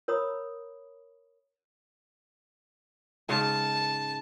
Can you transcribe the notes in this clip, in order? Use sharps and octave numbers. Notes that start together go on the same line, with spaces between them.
A#4 C#5 A#5 B5 D#6
G#2 C#3 A5